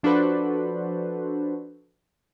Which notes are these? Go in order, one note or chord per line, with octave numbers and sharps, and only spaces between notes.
F3 D4 F#4 A4 B4 C5